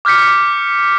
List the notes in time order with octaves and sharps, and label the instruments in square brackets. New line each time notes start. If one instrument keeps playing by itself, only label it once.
[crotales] D6 F6 G6 B6 C#7